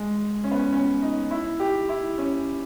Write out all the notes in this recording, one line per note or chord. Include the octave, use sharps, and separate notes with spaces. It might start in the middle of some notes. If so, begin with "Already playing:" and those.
Already playing: G#3
C#4
B3
C#4
C#4
D#4
E4
G4
E4
C#4